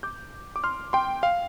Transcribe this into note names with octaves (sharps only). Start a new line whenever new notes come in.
D6 G6
D6
C6 F6
G5 C6
F5